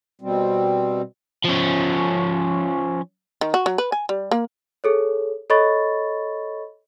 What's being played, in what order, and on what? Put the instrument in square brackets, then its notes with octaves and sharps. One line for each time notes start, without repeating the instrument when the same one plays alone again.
[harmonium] B2 G3 C4
[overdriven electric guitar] F3 C#4
[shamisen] D#3
F#4
F#3
B4
G#5
G3
A#3
[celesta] G#4 A4 C#5
A4 C#5 D#5 B5 C#6 A6